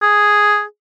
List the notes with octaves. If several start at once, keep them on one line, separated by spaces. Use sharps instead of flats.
G#4